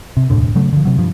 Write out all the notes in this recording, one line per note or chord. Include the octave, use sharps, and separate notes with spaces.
C3
E1 D2 A2 D3
C#3 F#3 A3
D3 F3
C3 F#3
G2 F3